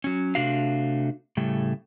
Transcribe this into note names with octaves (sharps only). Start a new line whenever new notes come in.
F#3 C#4
C3 A3 D4 F#4 F5
A2 C#3 G3 A3